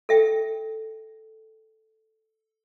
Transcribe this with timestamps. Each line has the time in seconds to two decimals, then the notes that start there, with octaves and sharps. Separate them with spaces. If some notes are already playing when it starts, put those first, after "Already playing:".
0.09 A4 E5 G5